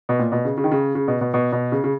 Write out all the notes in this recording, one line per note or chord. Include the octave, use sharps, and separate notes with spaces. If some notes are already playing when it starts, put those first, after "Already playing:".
B2
A#2
B2
C#3
C#3
D#3
C#3
C#3
B2
B2
B2
B2
C#3
C#3